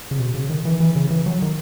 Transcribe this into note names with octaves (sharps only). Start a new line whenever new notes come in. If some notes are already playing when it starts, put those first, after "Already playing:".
C#3
B2
C#3
D#3
E3
E3
C#3
E3
F#3
D#3